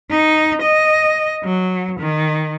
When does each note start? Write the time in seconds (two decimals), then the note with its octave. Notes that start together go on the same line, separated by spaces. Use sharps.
0.11 D#4
0.62 D#5
1.44 F#3
1.99 D#3